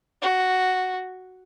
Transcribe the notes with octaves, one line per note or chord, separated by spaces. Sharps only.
F#4